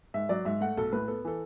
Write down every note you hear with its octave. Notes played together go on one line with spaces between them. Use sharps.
G#2 E5
F#3 D5
G#2 E5
A3 F#5
B1 A4
A2 B4
B3 A4
E3 A4